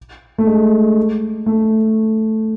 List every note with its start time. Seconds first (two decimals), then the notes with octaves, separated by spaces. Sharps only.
0.38 A3
0.47 G#3
1.46 A3